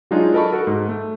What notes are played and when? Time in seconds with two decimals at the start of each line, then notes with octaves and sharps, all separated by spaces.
0.11 F#3 G#3 D4 D#4 F4 G#4
0.33 A4 A#4 D#5 A5 B5 C#6
0.52 F#4 A4 A#4
0.67 G#2
0.89 A3